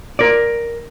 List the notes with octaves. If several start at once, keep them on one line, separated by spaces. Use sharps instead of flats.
A#4 D5